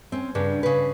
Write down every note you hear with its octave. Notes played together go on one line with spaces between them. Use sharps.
C4 C#4
G2 C#3 D4
C#3 B4